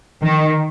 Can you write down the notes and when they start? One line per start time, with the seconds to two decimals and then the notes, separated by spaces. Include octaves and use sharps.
0.22 D#3